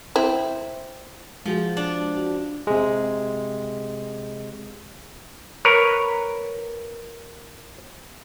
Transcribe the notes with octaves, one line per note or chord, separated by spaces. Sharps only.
C4 E4
F3 G#3 F#4 G#4
D4
F#4
C3 G#3
A#4 B4 C#5